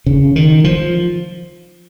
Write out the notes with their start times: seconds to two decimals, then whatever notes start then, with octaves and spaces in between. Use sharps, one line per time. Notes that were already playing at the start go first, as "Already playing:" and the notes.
0.06 C#3
0.36 D#3
0.64 F3